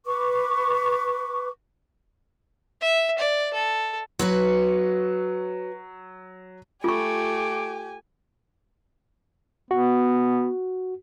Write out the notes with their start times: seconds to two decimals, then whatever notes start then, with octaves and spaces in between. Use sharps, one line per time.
0.06 B4 C#6 D6
2.82 E5
3.19 D5
3.54 A4
4.19 F#3 F#4 B4 C#5
6.84 A3 F4 G4 G#5 C#6 D6
9.71 B3 F#4